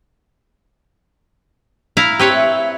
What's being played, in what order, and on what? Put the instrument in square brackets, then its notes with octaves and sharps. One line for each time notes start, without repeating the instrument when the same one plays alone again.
[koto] E4 F5 A#5
[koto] C4 B4 C#5 [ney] G4
[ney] E5